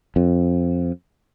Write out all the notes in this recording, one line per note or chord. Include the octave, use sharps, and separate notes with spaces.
F2